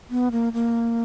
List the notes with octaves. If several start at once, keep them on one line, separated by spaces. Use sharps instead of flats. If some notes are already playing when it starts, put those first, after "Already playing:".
B3
A#3
A#3